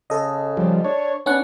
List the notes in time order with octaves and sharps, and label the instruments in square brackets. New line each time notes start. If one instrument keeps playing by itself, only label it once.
[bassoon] C#3 [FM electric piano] A4 D#5
[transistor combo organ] F3 G3
[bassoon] D4 [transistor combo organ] C#5
[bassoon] B3 [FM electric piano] C#4 F#5 [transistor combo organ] D4